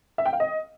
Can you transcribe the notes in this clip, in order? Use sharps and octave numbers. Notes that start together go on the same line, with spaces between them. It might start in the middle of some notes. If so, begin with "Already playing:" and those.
E5
G5
F5
D#5